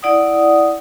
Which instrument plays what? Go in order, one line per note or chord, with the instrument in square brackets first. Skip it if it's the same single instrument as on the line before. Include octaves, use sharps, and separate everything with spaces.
[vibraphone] E4 D5 F#5 D#6